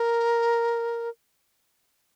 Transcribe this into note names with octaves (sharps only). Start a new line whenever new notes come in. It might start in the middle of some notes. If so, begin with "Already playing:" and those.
Already playing: A#4